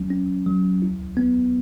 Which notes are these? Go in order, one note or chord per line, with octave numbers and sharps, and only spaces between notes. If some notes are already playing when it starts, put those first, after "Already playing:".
Already playing: F#3 C#4
C#4
F#3
E4
B3